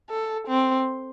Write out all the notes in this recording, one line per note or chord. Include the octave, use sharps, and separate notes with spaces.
A4
C4